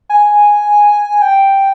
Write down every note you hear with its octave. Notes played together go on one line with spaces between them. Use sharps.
G#5
G5